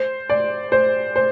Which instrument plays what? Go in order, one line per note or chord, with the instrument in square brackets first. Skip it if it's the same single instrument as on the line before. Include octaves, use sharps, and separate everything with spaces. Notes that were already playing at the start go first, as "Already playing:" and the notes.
Already playing: [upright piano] C5
D5
C5
C5